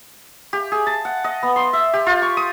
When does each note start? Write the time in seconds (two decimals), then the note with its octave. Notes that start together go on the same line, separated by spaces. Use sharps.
0.53 G4
0.72 G#4
0.86 A5
1.05 F#5
1.24 D#5
1.43 B3
1.56 C6
1.73 E5
1.93 G4
2.06 F4
2.22 C#6
2.37 D#6